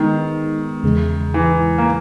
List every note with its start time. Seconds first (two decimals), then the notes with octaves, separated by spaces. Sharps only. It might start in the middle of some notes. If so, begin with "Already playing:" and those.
Already playing: D#3 G#3 B3 D#4
0.83 E2 C#3 G#3
1.34 E3
1.78 A#3